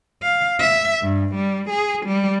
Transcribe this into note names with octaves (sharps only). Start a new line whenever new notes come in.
F5
E5
G2
G3
G#4
G3